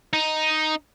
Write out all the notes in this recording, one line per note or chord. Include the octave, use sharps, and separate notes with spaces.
D#4